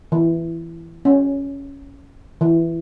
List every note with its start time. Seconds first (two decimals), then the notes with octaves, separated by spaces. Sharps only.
0.12 E3
1.05 C#4
2.41 E3